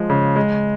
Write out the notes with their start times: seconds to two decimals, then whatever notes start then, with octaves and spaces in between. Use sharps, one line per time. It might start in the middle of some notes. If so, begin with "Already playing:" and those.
Already playing: F3 G#3
0.10 C#3
0.36 G#3